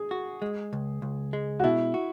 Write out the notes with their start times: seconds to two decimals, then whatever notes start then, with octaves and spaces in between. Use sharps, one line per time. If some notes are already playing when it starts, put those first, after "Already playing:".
Already playing: G#4
0.11 F#4
0.42 G#3
0.73 C#2
1.02 C#2
1.33 G#3
1.60 F#4
1.64 B2 E4
1.94 F#4